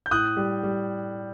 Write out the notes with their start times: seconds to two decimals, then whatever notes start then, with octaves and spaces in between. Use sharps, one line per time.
0.06 G6
0.11 A2 D#6 F#6
0.37 G3
0.63 G3